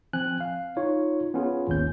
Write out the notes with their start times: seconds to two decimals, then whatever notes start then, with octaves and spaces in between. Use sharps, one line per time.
0.13 F3 C4 G#5 F#6
0.41 F5
0.76 D#4 F4 C#5
1.34 B3 C#4 F4 G#4
1.68 G#1 D#2 C#4 G6